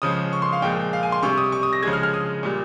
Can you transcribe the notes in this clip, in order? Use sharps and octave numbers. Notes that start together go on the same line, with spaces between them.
C#3 F3 G#3 D#6
C#6
C6
F5
A#2 F3 G#3 G5
F5
G#5
C6
C3 G3 C#6
D#6
C#6
D#6
A#6
C#3 F3 G#3 G#6
F6
F6
D#6
A#2 G3